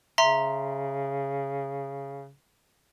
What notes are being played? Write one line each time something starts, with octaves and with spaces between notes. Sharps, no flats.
C#3 E5 A#5 C6